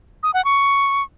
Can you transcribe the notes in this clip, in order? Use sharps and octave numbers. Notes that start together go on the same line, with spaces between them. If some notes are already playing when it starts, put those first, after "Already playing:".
D#6
F#5
C#6